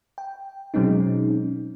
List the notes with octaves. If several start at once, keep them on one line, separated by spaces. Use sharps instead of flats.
G5
B2 F#3 G#3 C4 C#4 D#4